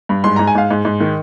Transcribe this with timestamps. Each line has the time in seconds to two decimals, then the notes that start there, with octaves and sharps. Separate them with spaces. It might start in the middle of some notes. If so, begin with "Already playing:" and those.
0.09 G2
0.24 G#2 C6
0.36 G#2 A#5
0.47 G#5
0.55 G#2 F5
0.71 G#2
0.85 G#2
1.00 D#3